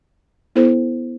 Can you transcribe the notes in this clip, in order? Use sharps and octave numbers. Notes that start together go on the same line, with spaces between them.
B3 E4 A4 C5